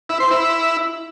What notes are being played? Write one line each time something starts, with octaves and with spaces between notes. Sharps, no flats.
E4
C5
E4